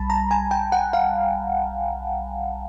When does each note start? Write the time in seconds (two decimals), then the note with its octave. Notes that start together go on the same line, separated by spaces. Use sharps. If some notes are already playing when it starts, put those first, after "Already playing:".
Already playing: B1 G3 A5 B5
0.10 A#5
0.31 G#5
0.51 G5
0.72 F#5
0.93 F5